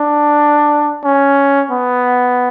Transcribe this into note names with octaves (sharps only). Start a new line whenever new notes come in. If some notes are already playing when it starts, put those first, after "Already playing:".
Already playing: D4
C#4
B3